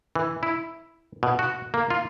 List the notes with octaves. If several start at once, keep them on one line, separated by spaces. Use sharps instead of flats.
E3
E4
B2
F#4
A#3
F4